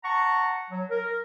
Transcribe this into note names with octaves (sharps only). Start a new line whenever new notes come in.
F#5 A5 A#5 C#6
F#3
A#4